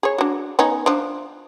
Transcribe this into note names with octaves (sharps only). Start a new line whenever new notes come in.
G#4 C#5
D4 F#4
B3 C#4 D#4
F3 D4